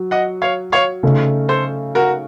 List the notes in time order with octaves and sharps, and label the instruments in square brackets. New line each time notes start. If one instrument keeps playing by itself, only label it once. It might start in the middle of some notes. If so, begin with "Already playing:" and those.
Already playing: [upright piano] F#3
[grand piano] D#5 F#5
C#5 F5
C#5 F5
[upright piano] C#3 A3 D#4
[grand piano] A4 C5
F#4 A#4